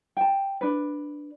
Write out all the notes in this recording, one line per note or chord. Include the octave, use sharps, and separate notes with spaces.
G5 A5
D4 B4